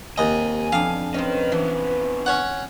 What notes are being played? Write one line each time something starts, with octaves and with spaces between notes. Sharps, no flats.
D#2 C3 D#5 G#5
F2 D3 B3 D4 D#4 F5
C4 C#4 A#4 B4 D#5
E3 B3 D4
C#4 C#5 F#5